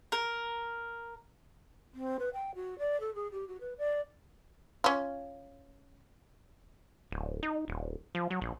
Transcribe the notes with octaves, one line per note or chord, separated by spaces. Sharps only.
A#4
C4
B4
G5
F#4
D5
A4
G#4
G4
F#4
B4
D5
C#4 F4
D1
D#4
D#1
F3
F#3
A#1